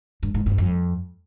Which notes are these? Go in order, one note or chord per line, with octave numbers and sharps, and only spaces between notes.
G2
G#2
G2
F2